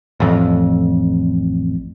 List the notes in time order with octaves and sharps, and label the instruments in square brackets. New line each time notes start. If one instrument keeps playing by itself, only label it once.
[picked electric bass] A1 F2